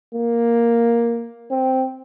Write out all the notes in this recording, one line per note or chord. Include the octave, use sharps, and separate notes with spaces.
A#3
C4